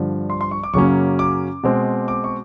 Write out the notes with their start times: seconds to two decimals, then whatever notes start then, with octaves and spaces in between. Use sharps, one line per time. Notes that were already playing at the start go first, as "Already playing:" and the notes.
Already playing: G2 D3 F3
0.30 C6
0.41 C6
0.51 C#6
0.63 D6
0.73 F#2 C#3 F#3 A#3 C#4 C#6
1.19 D6
1.63 B2 G#3 C4
2.08 D6
2.24 C#6